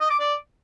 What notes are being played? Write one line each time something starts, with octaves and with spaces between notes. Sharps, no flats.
D#5
D6
D5